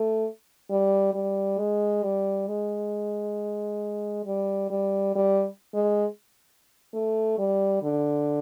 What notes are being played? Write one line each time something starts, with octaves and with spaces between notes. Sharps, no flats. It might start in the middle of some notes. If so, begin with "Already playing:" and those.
Already playing: A3
G3
G3
G#3
G3
G#3
G3
G3
G3
G#3
A3
G3
D3